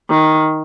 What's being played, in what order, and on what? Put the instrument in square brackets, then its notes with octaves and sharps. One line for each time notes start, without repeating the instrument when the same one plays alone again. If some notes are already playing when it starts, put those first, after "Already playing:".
[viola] D#3